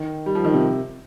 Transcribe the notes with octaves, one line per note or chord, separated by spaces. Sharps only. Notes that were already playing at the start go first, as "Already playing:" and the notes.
Already playing: D#3
G3
F3
D#3
C3